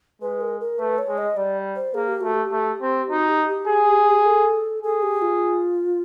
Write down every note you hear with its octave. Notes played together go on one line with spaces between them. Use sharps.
G#3 B4
A#4
A#4
A3 B4
C#5
G#3
D#5
G3 D5
C5
A#3 G#4
G4
A3 F#4
G4
A3
C4
D#4 F#4
G4
G4
G#4
A4
G#4 A4
G4
F4